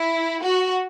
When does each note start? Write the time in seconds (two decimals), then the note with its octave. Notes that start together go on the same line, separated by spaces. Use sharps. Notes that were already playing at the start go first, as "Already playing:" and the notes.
Already playing: E4
0.42 F#4